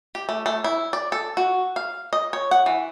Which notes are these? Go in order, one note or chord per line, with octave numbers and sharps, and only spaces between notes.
G4
A3
A3
E4
D5
A4
F#4
F5
D#5
C#5
F#5
E3